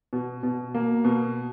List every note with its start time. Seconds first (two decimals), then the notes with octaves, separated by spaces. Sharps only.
0.13 B2
0.43 B2
0.74 A#3
1.04 B2